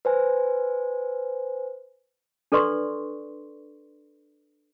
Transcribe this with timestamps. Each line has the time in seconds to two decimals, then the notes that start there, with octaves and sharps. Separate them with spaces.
0.05 B4 C5 G#5
2.52 D4 A4 B4 D5 C6 C#6